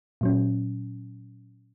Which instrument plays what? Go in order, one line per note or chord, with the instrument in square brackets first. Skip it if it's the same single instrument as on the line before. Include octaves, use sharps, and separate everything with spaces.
[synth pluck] A#2 F#3 C#4